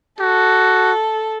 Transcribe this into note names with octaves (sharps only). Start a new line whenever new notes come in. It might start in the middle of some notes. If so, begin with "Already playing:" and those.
F#4 A4